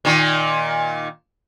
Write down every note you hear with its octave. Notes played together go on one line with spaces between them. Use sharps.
A#2 D#3